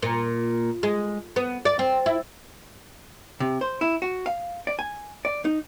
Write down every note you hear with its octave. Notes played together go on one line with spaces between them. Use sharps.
A#2
G#3
B3
D5
C4
E4
C3
C5
E4
F#4
F5
D5
G#5
D5
D#4